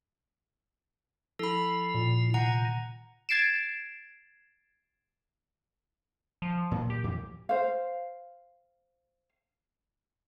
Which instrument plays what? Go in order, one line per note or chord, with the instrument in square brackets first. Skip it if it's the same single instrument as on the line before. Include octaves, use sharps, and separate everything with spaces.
[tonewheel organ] F3 E4 [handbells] A4 B5
[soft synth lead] A#2
[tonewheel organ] C3 D#3 G#5 [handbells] F#5 A#5
[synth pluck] G#6 A6 C7 D7 E7
[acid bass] F3
[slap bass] A#2 D#3 F#3
[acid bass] G4
[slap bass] F2 A#2 E3
[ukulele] C5 F5